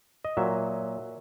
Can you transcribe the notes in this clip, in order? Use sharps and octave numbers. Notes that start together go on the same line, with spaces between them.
D#5
A#2 F#3 E5